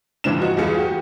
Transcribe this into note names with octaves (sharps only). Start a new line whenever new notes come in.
F1 G2 E3 F3 D4 E7
D#4 F#4
E2 G3 F4 G#4 C#7
F#4 G4